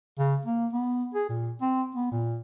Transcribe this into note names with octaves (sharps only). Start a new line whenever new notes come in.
C#3
A#3
B3
G#4
A#2
C4
B3
A#2